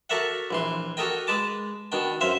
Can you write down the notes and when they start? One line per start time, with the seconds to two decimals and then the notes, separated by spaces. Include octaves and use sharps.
0.10 F#4 A4 A#4 D5 E5 F#5
0.51 A#1 E3 C6
0.97 F#4 G4 A4 A#4 D#5 G5
1.27 G#3 B4 A5 D6
1.92 B2 D#3 D4 G5
2.21 F#2 C5 E5 F5